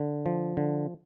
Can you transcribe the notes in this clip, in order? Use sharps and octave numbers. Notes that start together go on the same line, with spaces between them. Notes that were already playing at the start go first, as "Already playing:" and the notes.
Already playing: D3
F3
D3